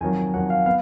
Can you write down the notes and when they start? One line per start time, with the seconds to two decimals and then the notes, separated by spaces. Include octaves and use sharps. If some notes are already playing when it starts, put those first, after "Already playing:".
0.01 F2 D#3 F#3 G#5
0.34 F2 D#3 F#3 F#5
0.50 F5
0.66 B3 F5